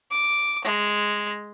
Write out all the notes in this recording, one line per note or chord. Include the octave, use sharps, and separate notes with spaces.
D6
G#3